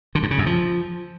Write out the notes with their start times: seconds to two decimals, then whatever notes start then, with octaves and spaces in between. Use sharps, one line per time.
0.15 D3
0.23 G2
0.31 C#3
0.39 F#2
0.46 F3